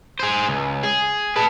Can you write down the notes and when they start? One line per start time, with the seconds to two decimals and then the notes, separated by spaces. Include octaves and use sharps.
0.20 G#4 C5
0.49 C#2
0.83 G#4
1.36 B4 A5